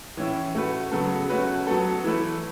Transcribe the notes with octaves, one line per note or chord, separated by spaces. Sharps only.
A2 E3 C#4 E4
A3 F#4 B4
C#3 F#3 B3 A4
A3 C#4 F#4 B4
F#3 B3 F#4 A4
E3 A3 E4 B4